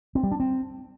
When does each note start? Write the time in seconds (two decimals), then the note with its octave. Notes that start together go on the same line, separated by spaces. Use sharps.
0.15 C4
0.23 G3
0.32 D4
0.40 C4